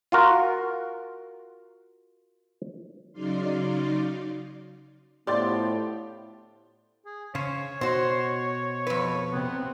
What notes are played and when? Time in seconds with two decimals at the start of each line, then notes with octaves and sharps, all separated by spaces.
0.12 F4 F#4 A#4
3.13 C#3 F#3 D#4 D5 F5 C6
5.27 A2 D3 F3 B3 G4 D5 C6 A6
7.06 G#4
7.35 C#3 C#4 C5 C#5
7.81 B2 F#4 C5
8.87 F2 B4
9.32 C3 B3 C4